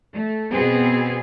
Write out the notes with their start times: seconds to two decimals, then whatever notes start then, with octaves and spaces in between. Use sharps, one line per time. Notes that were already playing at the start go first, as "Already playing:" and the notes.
0.13 A3
0.53 B2 B3 C4 G#4